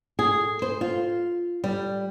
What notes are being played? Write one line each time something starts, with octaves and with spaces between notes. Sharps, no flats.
G#4
C5
F4
G3